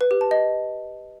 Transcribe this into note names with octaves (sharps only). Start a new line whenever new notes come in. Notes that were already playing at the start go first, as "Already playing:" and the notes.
B4
G4
A5
D#5